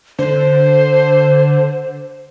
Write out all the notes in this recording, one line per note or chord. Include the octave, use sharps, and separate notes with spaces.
D3 C5